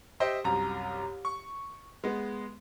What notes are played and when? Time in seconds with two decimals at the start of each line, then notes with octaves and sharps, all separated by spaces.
0.20 G4 C5 D#5 E5 G5
0.44 C2 F#2 A#5
1.25 C#6
2.04 G#3 B3